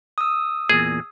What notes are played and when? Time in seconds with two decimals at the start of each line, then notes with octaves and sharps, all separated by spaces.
0.18 D#6 E6
0.69 E2 A#2 G#4